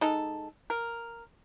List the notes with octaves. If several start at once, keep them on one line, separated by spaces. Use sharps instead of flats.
G#3 D#4 A4
A#4